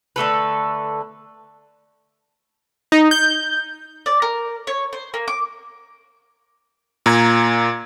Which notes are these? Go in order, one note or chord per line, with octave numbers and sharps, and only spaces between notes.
D3 A3 A4 B4
D#4
G6
D5
A#4
C#5
C5
A#3
D6
A#2 A#5 G#6